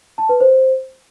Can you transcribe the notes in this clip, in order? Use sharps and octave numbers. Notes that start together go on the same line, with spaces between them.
A5
B4
C5